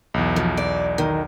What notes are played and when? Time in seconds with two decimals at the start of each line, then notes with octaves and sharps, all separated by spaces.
0.14 B1 E2
0.36 F3
0.57 D5
0.98 D#3